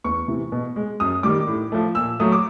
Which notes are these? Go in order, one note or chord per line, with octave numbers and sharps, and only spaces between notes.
E2 C#6
C3 E3
B2
G#3
F#2 D#6
D#3 G3 D6
A2
F3 A3
A#2 E6
F#3 A3 D#6
D6